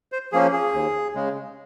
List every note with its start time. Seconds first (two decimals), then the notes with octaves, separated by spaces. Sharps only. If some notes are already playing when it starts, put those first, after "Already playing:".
0.12 C5
0.32 F3 A#3 C#4 G#4
0.53 G#4
0.73 D#2
1.15 C#3 G#3